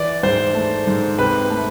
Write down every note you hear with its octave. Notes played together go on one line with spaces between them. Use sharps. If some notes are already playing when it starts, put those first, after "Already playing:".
Already playing: E3 D5
G#2 C5
A3
G#2
C3 B4
A3